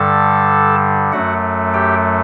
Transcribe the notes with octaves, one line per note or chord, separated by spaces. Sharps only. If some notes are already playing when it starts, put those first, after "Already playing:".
Already playing: G2 D3 G3 A4 A5
F#2 F#3 A3 F#4 F#5
G4 G5